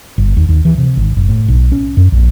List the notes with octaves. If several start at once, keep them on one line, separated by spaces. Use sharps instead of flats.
G1
D#2
D#2
E3
C3
G#1
F#1
A2
B1
C#4
F#2
A#1